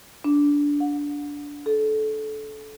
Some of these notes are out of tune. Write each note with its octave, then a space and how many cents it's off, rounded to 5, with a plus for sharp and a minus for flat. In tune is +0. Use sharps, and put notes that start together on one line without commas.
D4 -15
F#5 -40
A4 -25